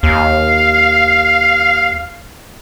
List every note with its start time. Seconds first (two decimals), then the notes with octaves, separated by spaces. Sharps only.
0.03 D#2 F5